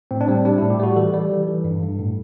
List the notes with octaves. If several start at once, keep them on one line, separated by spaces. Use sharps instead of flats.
A2 C4
D4
G3 C4
G3 D4
A2 E4
G4
G3 F#4
E3 A4
G3
E3
E3
G2
G2
A2